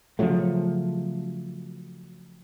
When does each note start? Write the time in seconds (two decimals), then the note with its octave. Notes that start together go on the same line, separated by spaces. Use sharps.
0.19 C#3 F3 F#3 A3